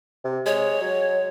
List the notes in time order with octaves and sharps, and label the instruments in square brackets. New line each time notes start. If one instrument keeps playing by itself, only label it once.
[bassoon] C3
[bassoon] G#3 [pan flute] C#5
[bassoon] F#3